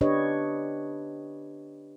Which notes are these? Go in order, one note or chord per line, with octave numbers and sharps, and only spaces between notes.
D4 G4 B4 C#5 D#5